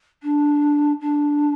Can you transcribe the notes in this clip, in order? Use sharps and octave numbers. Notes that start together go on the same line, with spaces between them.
D4
D4